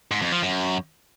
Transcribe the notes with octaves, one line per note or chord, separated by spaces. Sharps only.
G#2
F2
F3
F#2